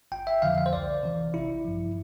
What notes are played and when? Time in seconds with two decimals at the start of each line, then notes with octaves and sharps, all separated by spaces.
0.12 G1 G5
0.27 E5
0.42 F2 D3 F3 F5
0.58 F5
0.66 C5
0.73 C2 D5
1.03 C3 E3
1.34 A1 E4
1.64 G2 F3